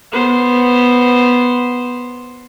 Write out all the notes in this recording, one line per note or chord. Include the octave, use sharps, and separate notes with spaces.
B3 C5